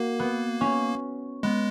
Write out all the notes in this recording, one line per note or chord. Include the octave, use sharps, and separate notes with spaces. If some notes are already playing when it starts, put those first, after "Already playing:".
Already playing: A#3 F#4 A#4
B3
C#4
G#3 B3